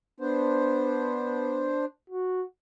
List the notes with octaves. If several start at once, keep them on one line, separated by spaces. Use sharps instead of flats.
B3 D4 C5
F#4